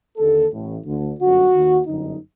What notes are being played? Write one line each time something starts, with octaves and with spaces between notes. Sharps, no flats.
D#2 D3 A4
A1 A2
D2 D3
G1 F#2 D3 F#4
D#2 D#3
G1 F#2 D3 D#4